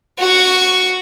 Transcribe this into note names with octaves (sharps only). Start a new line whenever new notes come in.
F#4 C#6